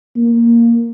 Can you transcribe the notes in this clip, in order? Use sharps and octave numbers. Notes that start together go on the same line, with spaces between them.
A#3